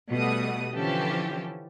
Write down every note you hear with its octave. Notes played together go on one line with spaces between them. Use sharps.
B2 G3 A3 F#5 D#6
D3 E3 F3 C#4 G4 A4